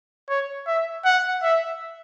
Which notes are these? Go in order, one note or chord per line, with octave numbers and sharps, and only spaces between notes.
C#5
E5
F#5
E5